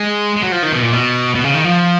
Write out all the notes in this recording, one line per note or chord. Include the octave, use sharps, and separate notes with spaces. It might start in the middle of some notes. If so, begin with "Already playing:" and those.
Already playing: G#3
G#3
F#3
F3
D#3
B2
A#2
B2
B2
C#3
D#3
F3